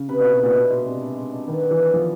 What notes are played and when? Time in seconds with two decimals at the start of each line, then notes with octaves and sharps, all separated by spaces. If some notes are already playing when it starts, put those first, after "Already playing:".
Already playing: C#3
0.08 C3 B4
0.20 B2
0.24 E4
0.32 B2
0.39 A#2 B4
0.55 B2 D4
0.70 B2 G#3
0.85 C3 G#3
1.00 D4
1.16 G#3
1.32 D4
1.47 D#3 B3
1.63 B3
1.71 E3
1.77 D4
1.93 F3 G4